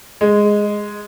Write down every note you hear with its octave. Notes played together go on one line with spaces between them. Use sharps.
G#3